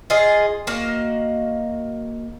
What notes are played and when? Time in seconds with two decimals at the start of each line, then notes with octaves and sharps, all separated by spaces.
0.10 F4 G#4 D#5
0.67 A#3 F#4 D#5 F5